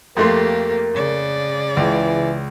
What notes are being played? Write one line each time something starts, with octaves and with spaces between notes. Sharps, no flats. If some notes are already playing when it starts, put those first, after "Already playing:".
F2 A3 A#3 G4 A#4 C6
C#3 D5
C#2 E3